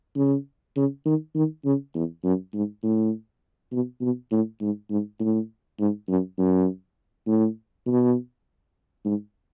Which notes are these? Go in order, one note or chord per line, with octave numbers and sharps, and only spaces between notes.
C#3
C#3
D#3
D#3
C#3
E2
F#2
G#2
A2
B2
B2
A2
G#2
G#2
A2
G#2
F#2
F#2
A2
B2
G#2